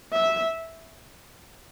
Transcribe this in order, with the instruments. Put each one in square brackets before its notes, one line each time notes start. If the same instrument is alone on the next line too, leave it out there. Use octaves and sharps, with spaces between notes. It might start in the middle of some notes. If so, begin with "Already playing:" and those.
[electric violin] E5